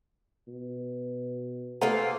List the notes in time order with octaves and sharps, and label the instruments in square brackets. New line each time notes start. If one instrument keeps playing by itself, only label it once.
[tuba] B2
[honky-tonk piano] A3 C5 [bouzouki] A#3 F4 G#4 [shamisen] B4 F#5 A#5